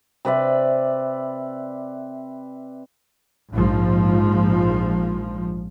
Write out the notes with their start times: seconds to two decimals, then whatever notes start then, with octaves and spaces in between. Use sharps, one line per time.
0.25 C3 B4 D5 E5
3.53 A#1 G#2 F3